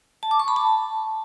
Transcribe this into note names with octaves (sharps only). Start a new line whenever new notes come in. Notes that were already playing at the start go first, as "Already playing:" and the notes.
A5
D6
C#6
B5
A5